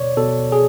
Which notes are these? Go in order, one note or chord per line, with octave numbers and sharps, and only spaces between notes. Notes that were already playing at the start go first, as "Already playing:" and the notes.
Already playing: B2 C#5 D5
B2 A4
G#4